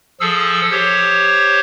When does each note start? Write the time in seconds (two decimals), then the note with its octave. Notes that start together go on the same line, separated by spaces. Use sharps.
0.20 F3 G#4 A4 E6
0.71 G4 C5 C#5